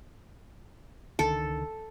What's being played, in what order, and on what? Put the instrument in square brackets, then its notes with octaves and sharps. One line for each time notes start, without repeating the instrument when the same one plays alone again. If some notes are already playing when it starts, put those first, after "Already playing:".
[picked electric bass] C#2 D3 D#3 [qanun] A4